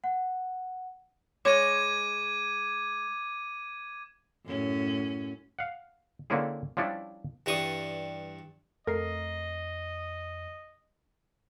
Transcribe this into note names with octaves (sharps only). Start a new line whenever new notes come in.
F#5
G#3 C#5 D6 G#6 D#7
F#2 A2 C#4
F5 F#5
D3 A#3 C4 C#4 E4 G#4
F3 G3 C#4 D4 E4
G2 E3 G3 C#6 D#6
F2 A3 A#4 D#5 C7